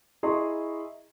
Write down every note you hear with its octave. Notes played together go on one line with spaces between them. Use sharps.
E4 G#4 D#5 A#5 C6 C#6